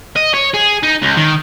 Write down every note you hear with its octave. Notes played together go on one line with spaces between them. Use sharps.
D#5
C#5
G#4
D#4
C#2
D#3